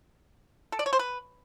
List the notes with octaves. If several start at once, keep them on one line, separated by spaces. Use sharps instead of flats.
A4
D5
C#5
C5
B4